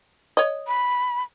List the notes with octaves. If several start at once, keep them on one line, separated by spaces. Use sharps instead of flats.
C#5 D#5
B5